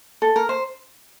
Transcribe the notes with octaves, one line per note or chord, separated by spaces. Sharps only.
A4
A#4
C5